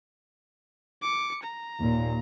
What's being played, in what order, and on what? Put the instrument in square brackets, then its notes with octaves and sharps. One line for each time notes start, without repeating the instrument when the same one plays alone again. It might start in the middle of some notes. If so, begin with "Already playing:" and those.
[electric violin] D6 C#7
A#5
[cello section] D#2 A#2